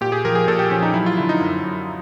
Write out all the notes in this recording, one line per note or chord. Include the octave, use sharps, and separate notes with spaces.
A#2 G4
G#4
F3 A#4
G#4
A#2 A4
G4
F3 C#4
D#4
F#3 E4
F4
D3 E4
D#4
F#2
F#2